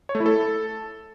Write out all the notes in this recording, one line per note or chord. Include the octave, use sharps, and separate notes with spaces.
C#5
A3
E4
A4